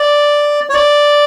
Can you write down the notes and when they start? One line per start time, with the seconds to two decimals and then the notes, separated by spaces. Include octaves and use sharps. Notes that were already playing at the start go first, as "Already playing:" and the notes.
Already playing: D5
0.69 C#5
0.74 D5